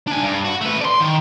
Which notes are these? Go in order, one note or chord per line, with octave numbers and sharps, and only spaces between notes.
D4 G#5
G2
F#4
A3 B4
D5 C6
D#3